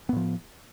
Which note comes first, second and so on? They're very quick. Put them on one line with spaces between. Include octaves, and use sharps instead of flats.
B3 A2 F3